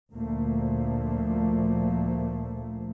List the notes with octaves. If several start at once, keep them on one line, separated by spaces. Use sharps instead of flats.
D2 A#2 F3 A3 A#3